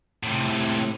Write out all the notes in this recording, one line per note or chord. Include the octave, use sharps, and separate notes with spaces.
A2 C3